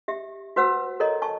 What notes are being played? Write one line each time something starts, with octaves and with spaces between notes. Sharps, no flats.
G4 E5
F#4 B4 C5 F#5 E6
A4 A#4 C#5 D#5 A#5
G#5 A5 C#6